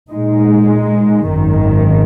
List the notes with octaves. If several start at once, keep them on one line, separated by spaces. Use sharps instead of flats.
A#2 G#3 D#4
G#1 F#2 D#3